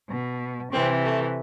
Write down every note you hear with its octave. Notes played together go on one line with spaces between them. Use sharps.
B2
C3 E3 C4
A3